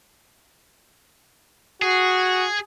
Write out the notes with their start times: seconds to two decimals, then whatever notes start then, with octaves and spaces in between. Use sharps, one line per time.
1.82 F#4 G#4